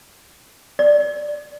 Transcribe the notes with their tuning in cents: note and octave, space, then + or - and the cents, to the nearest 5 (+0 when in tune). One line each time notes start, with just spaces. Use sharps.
D5 +5